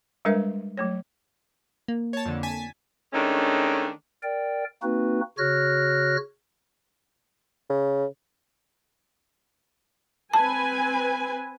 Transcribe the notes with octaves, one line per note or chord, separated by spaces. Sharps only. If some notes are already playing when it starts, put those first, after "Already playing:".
G3 G#3 D4 A#4 B4 E5
F#3 A3 C#5
A#3
C#5 A5
F2 D3
G#5 A5 B6
D#3 G#3 A3 C#4 D4
A#4 D5 G5
A#3 C4 D#4 F#4 B4
C#3 F#4 C#5 F6 F#6 A#6
C#3
C4 B4 G#5 A5